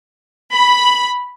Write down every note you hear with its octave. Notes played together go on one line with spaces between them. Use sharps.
B5